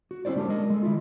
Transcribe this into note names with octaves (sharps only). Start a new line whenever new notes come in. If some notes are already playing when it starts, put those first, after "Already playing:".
F#4
C4 D#4 E4 C5 D5
G#3 D4 G4 A#4
G#3 A#4 D#5
G#3 A4
D#3 E4 F4